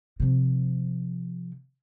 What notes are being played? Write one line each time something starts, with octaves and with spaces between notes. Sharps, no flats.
C3 F3